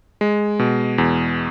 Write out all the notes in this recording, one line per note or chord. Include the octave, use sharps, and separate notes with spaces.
G#3
B2
E2